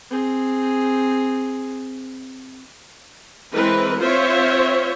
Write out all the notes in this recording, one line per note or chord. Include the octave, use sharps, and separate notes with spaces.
C4 G#4
E3 G#3 C4 A#4 B4
C4 F4 C5 C#5 E5